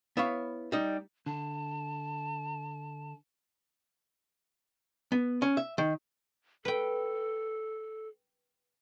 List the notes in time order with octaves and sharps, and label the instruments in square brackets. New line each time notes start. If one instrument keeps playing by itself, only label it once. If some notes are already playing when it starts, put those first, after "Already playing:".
[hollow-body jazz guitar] B3 E4 C#5 F5
G3 D#4
[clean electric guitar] D3 [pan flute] A5
[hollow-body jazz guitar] B3
C#4
E5
D#3
[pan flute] A4 [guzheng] B4 G5